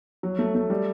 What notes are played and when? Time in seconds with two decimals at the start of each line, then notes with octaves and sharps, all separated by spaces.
0.23 F#3
0.39 A3
0.55 A3
0.70 G3